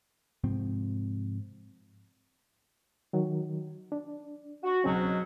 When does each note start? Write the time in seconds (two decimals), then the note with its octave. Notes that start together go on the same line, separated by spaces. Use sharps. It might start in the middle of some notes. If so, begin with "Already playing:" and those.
0.44 G#2 C3 F3 C4
3.13 D#3 F#3
3.92 D4
4.64 F#4
4.84 C#2 G#2 B2 F#3 C4 C#4